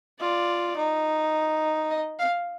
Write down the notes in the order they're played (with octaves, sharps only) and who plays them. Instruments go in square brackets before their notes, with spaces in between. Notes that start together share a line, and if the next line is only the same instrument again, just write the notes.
[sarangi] F4 [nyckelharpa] D5
[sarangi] D#4
[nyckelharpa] D#5
F5